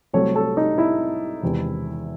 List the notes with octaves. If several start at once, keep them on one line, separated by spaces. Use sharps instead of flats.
C2 C3 F#3 A3 C4 A4 C#5
A4 C#5
D#4
E4
E1 E2 C3 D#3